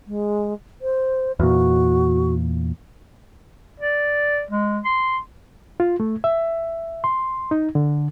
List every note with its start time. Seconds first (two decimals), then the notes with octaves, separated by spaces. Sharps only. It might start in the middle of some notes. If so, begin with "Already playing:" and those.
0.07 G#3
0.81 C5
1.39 E2 A#2 F#4
3.80 D5
4.51 G#3
4.85 C6
5.80 F4
6.00 A3
6.24 E5
7.04 C6
7.51 D#4
7.75 D3